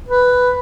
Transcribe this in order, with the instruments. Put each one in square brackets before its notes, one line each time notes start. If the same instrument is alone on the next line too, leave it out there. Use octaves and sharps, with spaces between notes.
[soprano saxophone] B4